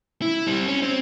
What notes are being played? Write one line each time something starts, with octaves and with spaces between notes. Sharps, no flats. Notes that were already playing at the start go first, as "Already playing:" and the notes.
E4
G3 C4
C#4
C4